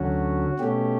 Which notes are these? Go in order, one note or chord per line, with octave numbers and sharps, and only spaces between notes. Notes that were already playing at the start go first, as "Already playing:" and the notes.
Already playing: D2 D3 F#3 C#4 F#4
B2 A3 C#4 G4